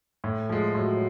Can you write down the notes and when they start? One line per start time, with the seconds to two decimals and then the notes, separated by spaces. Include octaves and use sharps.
0.24 A2 A3
0.49 F3 G#3
0.75 A2 F#3